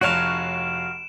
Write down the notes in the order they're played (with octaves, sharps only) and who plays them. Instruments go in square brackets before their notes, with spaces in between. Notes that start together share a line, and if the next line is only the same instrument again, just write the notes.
[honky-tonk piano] F1 C#5 F#6 [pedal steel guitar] F#4 F5 [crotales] D7 E7